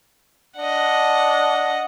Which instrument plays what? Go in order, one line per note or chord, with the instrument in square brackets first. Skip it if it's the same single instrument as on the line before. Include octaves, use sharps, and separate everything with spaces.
[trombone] D4 [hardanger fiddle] D#5 F#5